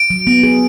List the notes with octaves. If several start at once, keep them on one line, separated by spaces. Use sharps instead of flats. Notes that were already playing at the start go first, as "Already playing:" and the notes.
Already playing: D7
F#3
B3
G#4